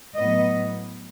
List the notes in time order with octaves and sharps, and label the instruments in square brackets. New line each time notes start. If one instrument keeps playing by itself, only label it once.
[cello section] A2 F#3 B3 D#5